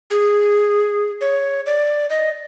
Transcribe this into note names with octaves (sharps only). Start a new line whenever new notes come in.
G#4
C#5
D5
D#5